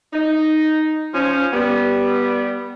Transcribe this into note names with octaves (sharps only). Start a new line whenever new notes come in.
D#4
F3 C#4
G3 B3